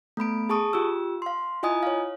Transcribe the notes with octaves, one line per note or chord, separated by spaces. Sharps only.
A3 B3 B5 D7
G#4 A5 C#6 D#6
F4 G4 E6
F5 C6
E4 F4 D#5 G#5 D#6
C#5 F5